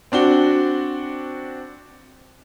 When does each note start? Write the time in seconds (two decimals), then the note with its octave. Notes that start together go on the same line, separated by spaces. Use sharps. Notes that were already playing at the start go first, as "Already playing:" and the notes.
0.12 C4 D4 F#4 G7